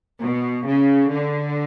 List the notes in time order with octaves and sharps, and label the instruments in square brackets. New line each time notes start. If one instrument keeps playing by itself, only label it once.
[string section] B2
C#3
D3